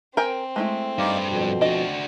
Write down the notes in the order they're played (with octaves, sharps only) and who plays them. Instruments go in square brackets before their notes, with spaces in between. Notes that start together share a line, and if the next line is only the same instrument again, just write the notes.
[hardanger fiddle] C4 [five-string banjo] A#4 G5 G#5
[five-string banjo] G#3 A3 E4
[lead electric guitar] G2 [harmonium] D#4 D5 F5
[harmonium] F2 B2
[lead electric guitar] D4 F#4 [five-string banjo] D#5